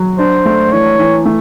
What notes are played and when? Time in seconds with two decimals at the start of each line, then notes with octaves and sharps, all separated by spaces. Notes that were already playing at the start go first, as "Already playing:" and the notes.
Already playing: F#3
0.19 D4 C5
0.46 A3
0.72 E3 C#5
1.00 E3
1.26 A3